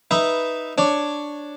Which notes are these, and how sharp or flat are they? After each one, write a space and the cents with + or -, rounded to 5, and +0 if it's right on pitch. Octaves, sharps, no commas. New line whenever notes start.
D#4 +0 B4 +0 E5 +0
D4 +0 C#5 +0